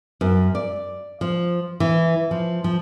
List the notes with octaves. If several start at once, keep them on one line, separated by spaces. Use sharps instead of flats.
F#2
D5
F3
E3
F3
F3